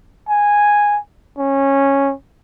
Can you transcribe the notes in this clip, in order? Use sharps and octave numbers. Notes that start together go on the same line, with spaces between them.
G#5
C#4